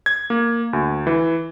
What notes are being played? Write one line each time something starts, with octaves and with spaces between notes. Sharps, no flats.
G#6
A#3
D2
E3